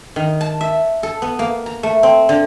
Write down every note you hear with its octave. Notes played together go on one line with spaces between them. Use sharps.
D#3
A5
E5
A4
B3
A#3
A#5
A3
C4
D3